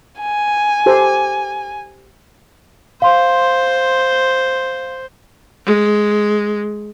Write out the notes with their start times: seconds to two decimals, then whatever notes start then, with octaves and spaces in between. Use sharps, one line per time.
0.21 G#5
0.86 G4 A4 C5
3.02 C5 F5 C6
5.65 G#3